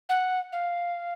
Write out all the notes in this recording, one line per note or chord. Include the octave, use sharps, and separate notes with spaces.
F#5
F5